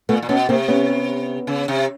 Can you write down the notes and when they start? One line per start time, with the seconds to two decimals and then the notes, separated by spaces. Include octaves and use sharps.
0.09 A#2 A3 B3
0.22 A#2
0.29 B2 B3 C#4
0.49 C3 A#3 C4
0.68 B3 C#4
1.47 C#3
1.68 C3